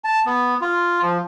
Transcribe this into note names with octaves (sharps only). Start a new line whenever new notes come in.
A5
B3
F4
F3